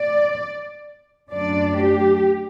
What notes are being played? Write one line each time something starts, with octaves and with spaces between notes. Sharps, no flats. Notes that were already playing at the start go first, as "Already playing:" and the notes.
Already playing: D5
F#2 D3 A3 D4 D5
G4